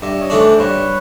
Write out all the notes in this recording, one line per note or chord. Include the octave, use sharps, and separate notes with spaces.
G2 D5 E5
C#5 D#5
E3 A3 D4
C5 D5
G2 B4 C#5